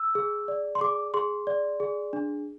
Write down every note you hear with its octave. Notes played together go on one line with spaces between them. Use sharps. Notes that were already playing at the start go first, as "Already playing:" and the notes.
Already playing: E6
G#4
D5
C6
G#4 D6
G#4 C6
D5
G#4
D4